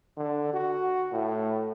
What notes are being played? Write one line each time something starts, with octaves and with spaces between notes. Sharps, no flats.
D3
F#4
A2